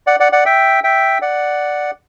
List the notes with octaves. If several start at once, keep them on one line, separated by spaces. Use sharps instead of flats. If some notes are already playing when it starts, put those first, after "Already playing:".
D5 F#5
D5 F#5
D5 F#5
E5 G5
E5 G5
D5 F#5